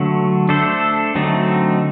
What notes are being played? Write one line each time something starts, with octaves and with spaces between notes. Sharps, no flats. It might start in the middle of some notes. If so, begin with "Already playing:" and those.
Already playing: D3 F#3 A3
A3 D4 A4 C5
D3 F#3 A3 C4 D#4